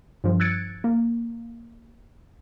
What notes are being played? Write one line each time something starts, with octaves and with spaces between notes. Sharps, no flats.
G2 F3
E6 F#6 G#6 A6 C#7 D7
A#3